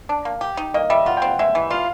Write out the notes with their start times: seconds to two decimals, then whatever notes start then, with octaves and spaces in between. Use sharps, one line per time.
0.09 D4
0.25 A#3
0.41 G4
0.57 D#4
0.74 A#3 D#5
0.90 G3 E5
1.06 F4 F#5
1.17 G5
1.22 C4
1.28 F#5
1.39 G#3 E5
1.55 E3
1.70 F4 F5